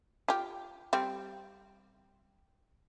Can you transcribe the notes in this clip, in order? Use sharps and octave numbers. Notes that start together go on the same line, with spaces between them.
F4 G4
G3 C4